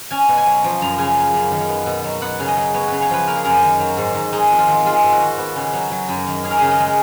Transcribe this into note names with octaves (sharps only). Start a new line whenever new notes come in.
C#4 G#5
B2
G#5
F#3
F3
F#2 A#5
C#3 G#5
A#3
F#2
D#3
B3
B2
F#3
B3 F#5
C#3
D#5
F#3
B3 C#5
C#3 B4
C#5
F3 B4
A#3 A#4
G#4
F#2 A#4
D#3
F#3
G#2
D#3
G#3 D#4
F2
F4
D#3
G#3 F4
G#2
F#4
D#3
B3
C#3
F#3
F#3
F#2
D#3
C#4 G#4
A#4
C#3 G#4
D#5
G#3